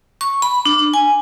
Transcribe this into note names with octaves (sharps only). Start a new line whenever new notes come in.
C#6
B5
D4
G#5